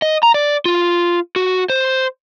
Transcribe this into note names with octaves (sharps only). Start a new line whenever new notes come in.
D#5
A#5
D5
F4
F#4
C5